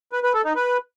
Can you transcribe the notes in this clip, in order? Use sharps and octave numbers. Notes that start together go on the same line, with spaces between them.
B4
B4
A4
D#4
B4